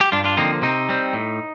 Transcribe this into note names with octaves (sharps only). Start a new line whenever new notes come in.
G4
G2 D4 F4
D4 F4
D3 F3 A#3 C4 D#4
C3 C4 D#4
G3 C4
A2